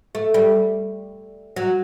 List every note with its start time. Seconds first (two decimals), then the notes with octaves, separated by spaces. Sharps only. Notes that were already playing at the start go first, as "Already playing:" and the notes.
0.15 A3
0.34 G3
1.56 F#3